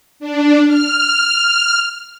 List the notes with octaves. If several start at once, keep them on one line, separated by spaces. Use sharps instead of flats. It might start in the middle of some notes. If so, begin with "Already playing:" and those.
D4
F6